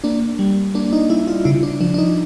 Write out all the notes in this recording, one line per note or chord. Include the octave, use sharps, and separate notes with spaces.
A#3 D4
G3
A#3 D4
D#4
G3 E4
F4
C#3 E4
D4
F3 D4
D4
D#4